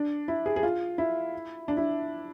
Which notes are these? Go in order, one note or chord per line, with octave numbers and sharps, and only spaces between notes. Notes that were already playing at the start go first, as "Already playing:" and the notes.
Already playing: D4
E4
G#4
G#4
F4
E4
D4
E4